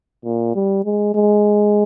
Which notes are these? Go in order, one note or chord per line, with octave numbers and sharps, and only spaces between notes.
A#2
G3
G#3
G#3